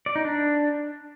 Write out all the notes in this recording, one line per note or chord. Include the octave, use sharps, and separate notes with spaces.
D5
D#4
D4